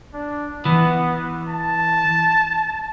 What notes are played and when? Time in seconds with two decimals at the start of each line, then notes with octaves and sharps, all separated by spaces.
0.14 D4
0.65 E3 B3
1.48 A5